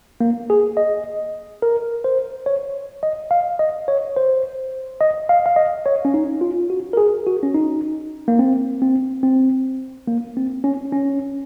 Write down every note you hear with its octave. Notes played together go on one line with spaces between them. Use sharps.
A#3
G#4
D#5
A#4
C5
C#5
D#5
F5
D#5
C#5
C5
D#5
F5
F5
D#5
C#5
C#4
D#4
F4
F#4
A#4
G#4
F#4
C#4
D#4
A#3
C4
C4
C4
A#3
C4
C#4
C#4